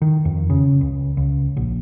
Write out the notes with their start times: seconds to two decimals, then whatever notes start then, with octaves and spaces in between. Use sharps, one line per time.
0.02 D#3
0.25 F2
0.50 C#3
0.81 C#2
1.17 C#2
1.57 A#1